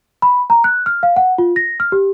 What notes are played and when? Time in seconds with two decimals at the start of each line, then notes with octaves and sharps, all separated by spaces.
0.22 B5
0.50 A#5
0.64 F#6
0.86 F6
1.03 F5
1.16 F#5
1.38 F4
1.56 A#6
1.80 F6
1.92 G4